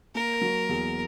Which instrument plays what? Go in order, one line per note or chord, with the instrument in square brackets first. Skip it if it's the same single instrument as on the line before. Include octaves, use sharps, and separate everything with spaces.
[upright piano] A#3 [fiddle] A#4
[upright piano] F#3
E2